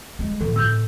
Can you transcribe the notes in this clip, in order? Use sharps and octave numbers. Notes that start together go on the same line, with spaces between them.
G3 G#3
A2 C3 E3
A2 C3 E6 G6